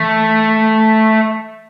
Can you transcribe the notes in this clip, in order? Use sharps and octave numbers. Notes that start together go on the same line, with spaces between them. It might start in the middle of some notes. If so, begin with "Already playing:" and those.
Already playing: E3 A3